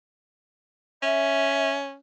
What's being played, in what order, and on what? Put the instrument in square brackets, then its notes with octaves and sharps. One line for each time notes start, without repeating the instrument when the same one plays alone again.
[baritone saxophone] C#4 [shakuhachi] E5